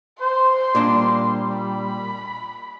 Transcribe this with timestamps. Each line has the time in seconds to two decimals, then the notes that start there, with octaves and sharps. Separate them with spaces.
0.21 C5 C6
0.75 A#2 G3 D4
1.58 B5